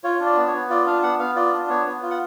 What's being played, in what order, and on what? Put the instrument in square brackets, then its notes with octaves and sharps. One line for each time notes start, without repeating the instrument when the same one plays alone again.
[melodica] F4 C#5
D4
D5
B3
C#5
B3
F4 D5
D4 F5
B3 F#5
B3 F5
F4 D5
D4
B3 C#5
B3
F4
F#5